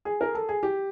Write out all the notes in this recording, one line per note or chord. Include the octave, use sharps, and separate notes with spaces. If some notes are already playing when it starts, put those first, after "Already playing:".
G#4
A#4
A4
G#4
G4